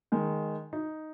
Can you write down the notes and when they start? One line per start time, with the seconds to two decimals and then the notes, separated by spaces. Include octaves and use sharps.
0.12 D#3 G#3
0.73 D#4